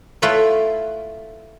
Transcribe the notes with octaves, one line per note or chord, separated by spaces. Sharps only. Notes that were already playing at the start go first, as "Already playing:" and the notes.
A3 E4 F4 B4 C#5